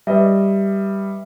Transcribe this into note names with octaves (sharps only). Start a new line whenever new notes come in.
G3 B4 D#5 E5